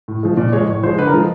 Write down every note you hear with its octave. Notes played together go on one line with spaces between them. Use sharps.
A2
F3 G#3
A#2 D5
F3 G#3 C#5
A2 C#5
F3 G#3 C5
D3 B4
A#4
F3 G#3